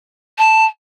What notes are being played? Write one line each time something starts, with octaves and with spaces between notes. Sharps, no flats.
A5